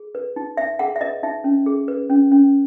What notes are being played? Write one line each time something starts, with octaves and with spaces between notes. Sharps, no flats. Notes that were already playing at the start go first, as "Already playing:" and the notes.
Already playing: G#4
B4
D#4
D#4 E5
G#4 F#5
E5
B4 D#5
D#4 E5
C#4
G#4
B4
C#4
C#4